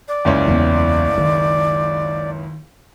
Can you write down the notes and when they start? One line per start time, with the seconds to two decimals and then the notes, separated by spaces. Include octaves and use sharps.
0.08 D5
0.25 F#1 C#2 C#4
0.48 E2
1.18 D#3